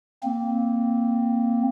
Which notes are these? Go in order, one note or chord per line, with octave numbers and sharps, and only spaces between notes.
A#3 C4